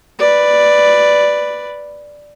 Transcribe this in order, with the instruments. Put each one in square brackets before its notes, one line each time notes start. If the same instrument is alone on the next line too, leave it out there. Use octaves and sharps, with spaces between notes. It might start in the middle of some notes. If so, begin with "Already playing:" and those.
[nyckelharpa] B4 D5